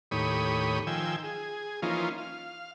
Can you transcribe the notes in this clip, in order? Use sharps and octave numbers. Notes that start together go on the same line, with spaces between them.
D#2 A2 G4 C#5 B5 D#6
D#3 F3 G5 G#5 E6
G#4
E3 F3 A#3 C#4 D#4 F4
F5